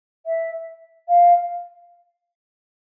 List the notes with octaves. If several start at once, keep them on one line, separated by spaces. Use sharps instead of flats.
E5
F5